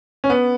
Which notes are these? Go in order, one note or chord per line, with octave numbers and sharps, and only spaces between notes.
C#4
B3